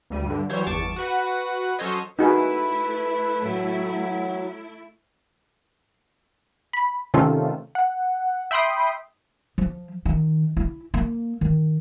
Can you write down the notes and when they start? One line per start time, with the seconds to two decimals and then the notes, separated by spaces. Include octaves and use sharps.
0.10 D2 G3 D#7
0.26 G2 D3
0.50 E3 F#3 G3 C5 C#5
0.67 G1 E2 A5 C#6 D6 A6
0.96 F#4 B4 F#5
1.79 F#3 C#4 A4 C5 C#5 D#5
2.19 A3 D#4 E4 F#4 G#4 B4
3.42 A2 E3 F#3
6.73 B5
7.14 C3 D#3 A3 C#4 F4 A4
7.75 F#5
8.51 E5 G5 B5 C6 D#6
9.58 F3
10.05 D#3
10.57 E4
10.94 A#3
11.41 D#3